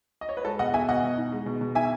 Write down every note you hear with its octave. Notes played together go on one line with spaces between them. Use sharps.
D#5
C#5
B4
G#3 A4
B2 D#5 F#5
B2 E5 G#5
B2 D#5 F#5
B2
D#4
G#3
B2
B2
D#4 E5 G#5